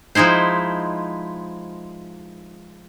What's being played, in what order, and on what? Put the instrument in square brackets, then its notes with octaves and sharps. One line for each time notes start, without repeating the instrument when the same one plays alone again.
[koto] F3 G#3 D#4 E4 C5